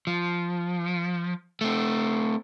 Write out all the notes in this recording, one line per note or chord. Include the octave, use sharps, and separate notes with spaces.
F3
A3 C4